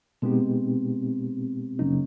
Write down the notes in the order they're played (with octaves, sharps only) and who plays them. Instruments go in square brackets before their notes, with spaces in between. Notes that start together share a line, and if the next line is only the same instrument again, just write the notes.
[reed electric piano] B2 G#3 B3 D#4 G4 [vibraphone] C4
[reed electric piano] F#2 C#3 F#3 A#3 D#4 [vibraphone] C#4